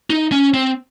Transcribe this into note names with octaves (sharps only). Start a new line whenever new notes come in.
D#4
C#4
C4